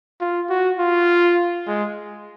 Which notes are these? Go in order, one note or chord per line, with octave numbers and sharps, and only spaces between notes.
F4
F#4
F4
G#3